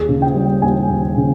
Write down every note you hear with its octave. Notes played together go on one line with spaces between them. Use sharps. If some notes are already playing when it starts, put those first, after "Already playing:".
Already playing: D#2 G#4
C#3
G5
G3
D#2 G#5
D#2
C#3